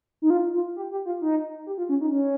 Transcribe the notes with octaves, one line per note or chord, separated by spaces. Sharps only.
D#4
F4
F4
G4
G4
F4
D#4
G4
F4
C#4
D#4
C#4